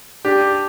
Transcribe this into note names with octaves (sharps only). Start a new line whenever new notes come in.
D4 G4